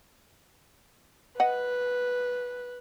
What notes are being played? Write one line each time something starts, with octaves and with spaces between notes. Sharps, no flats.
B4 D#5 F#5